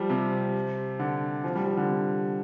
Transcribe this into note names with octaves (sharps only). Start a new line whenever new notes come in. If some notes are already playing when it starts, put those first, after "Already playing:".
Already playing: F3 G3
C3
D3
F3
G3
F3
D3
C3